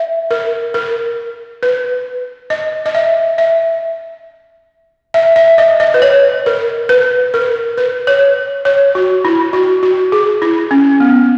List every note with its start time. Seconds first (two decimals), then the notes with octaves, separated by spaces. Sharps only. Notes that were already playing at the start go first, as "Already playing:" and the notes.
Already playing: E5
0.31 A#4
0.74 A#4
1.63 B4
2.50 D#5
2.86 D#5
2.95 E5
3.38 E5
5.14 E5
5.36 E5
5.58 D#5
5.80 D#5
5.94 B4
6.02 C#5
6.46 A#4
6.89 B4
7.34 A#4
7.78 B4
8.07 C#5
8.65 C#5
8.95 F#4
9.25 E4
9.53 F#4
9.83 F#4
10.12 G#4
10.42 E4
10.71 C#4
11.00 B3